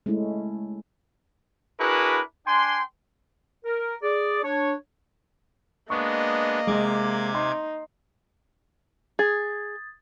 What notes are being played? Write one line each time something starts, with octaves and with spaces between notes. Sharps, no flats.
G#3 A3 C#4 E4
D4 E4 F#4 G#4 A#4 B4
D4 G5 G#5 C6
A#4
G#4 D5
D4 C#5
G#3 A#3 B3 D4 D#5 C#6
C3 G#3 D6 G#6
D#4 C6
G#4 D#6 G#6 A6